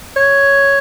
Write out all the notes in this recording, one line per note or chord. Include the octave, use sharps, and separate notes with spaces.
C#5